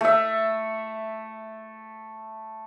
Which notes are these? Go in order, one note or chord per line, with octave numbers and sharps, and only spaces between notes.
A3 E5